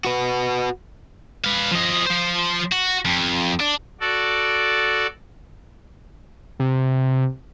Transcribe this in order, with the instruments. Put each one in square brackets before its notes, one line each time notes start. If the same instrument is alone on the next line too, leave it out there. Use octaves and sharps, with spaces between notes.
[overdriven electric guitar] F#4 B4
[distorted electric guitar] B4 F5
F3 D#5
F3 C5
F#4
F2
D4
[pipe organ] F#4 A4 D5
[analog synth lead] C3